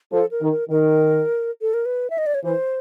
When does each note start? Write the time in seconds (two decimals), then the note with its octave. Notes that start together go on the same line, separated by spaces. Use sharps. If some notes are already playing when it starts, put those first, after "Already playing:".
0.12 F3 A4
0.31 A#4
0.42 D#3
0.51 A#4
0.70 D#3 A#4
1.62 A4
1.74 A#4
1.86 B4
2.10 E5
2.18 D#5
2.26 D5
2.34 C#5
2.44 E3 C5